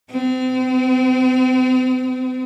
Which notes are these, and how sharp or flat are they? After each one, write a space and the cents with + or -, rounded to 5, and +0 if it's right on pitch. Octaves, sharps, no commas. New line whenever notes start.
C4 -40